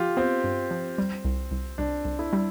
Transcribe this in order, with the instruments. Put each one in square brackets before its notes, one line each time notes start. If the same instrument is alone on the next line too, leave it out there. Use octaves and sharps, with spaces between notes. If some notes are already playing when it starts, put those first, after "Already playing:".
Already playing: [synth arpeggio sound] F3 [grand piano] F4 G4
[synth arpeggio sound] B3 [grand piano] C4
[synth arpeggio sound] G2
F3
G3
C2
C2
[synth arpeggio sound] C2 [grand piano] D4
[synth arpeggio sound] C2
[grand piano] E4
[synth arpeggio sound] G3